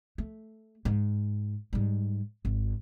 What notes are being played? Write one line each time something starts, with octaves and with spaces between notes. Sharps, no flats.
A3
G#2
G#2 G3
G#1